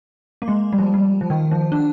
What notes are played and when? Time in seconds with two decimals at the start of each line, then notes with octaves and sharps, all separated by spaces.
0.42 A#3
0.48 G#3
0.73 G3
0.79 F3
0.94 G3
1.21 F3
1.30 D#3
1.51 F3
1.72 D4